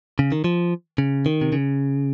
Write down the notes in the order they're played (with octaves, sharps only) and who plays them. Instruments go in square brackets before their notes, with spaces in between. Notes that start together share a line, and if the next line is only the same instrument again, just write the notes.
[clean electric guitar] C#3
D#3
F3
C#3
D#3
C3
C#3